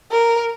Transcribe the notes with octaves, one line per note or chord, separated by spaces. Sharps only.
A#4